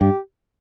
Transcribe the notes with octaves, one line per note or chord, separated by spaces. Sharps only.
G2 G4